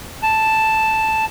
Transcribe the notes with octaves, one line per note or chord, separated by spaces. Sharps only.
A5